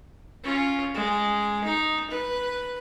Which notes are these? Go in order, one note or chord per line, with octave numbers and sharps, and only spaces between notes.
C#4 F4
G#3
D#4
B4